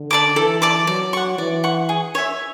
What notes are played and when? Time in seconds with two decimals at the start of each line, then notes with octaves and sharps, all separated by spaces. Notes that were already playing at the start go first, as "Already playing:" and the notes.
Already playing: D3
0.11 D5 A5 D6
0.36 E3 A4
0.62 D5 A5 D6
0.87 F#3 D5
1.13 F#5 C#6
1.38 E3 D5
1.64 F#5 C#6
1.89 G#4
2.15 C#5 E5